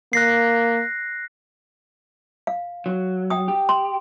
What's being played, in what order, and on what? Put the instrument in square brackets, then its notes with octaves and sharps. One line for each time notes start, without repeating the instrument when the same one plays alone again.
[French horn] A#3 [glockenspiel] F#6 A#6 C7
[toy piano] F5
[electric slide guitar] F#3
[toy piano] F#5 G5 D#6
[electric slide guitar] G4
[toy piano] C6